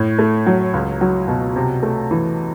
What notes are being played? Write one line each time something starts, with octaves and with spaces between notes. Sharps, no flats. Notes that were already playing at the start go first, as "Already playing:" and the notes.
Already playing: A2
A3
F#3
C#2
F#3
B2
C3
A3
E3